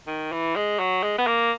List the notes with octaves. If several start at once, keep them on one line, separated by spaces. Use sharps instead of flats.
D#3
E3
G#3
F#3
G#3
B3
A#3